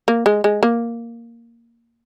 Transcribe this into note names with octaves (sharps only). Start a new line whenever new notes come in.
A#3
G#3
G#3
A#3